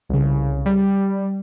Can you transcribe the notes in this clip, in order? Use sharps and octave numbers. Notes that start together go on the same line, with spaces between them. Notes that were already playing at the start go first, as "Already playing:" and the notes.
C2 C#3
G3